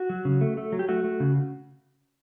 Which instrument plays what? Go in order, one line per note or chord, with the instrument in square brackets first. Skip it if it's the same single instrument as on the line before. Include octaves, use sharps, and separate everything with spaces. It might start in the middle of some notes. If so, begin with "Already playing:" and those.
Already playing: [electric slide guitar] F#4
F#3
C#3
A3
A3
F#3
G4
A3 F#4
A3
C#3